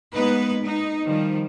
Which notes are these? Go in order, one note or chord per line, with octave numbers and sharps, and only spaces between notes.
G#3 A#3 B3 D#4 B4
D#4
D#3 F3 G3